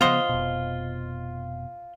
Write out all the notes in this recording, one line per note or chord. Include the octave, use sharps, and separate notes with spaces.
C#3 F3 B3 F4 C5 D#5 F#5 C6
F1 B2